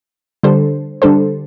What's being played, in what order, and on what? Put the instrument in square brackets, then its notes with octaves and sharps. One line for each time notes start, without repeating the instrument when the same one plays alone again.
[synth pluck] D3 G3 D4 A4 C5
D3 G3 D4 A4 C5